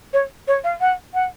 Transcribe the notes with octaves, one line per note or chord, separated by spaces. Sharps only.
C#5
C#5
F5
F#5
F#5